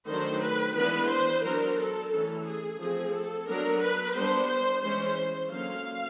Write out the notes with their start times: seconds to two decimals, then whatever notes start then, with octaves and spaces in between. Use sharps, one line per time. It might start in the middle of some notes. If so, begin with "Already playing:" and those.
0.08 D#3 F#3 A3 D4 C5
0.42 B4
0.76 E3 G#3 B3 D4 B4
1.10 C5
1.44 F#3 B3 D4 A#4
1.78 A4
2.11 E3 A3 C#4 A4
2.46 G#4
2.80 F3 A3 C4 G#4
3.13 A4
3.47 F#3 B3 D4 A#4
3.82 B4
4.15 G3 B3 D4 C5
4.48 C5
4.82 E3 G#3 C#4 C5
5.51 D3 F#3 A#3 C#4 F5